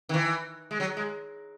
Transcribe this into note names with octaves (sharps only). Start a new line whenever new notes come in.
D#3
E3
G#3
F#3
G#3